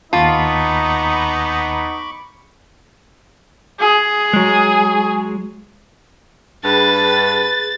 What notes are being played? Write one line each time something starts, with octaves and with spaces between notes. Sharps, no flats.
D#2 B3 D#4 F4 A5 B5 C#6 D6
G#4
F#3 G#3
G2 G#4 B4 A6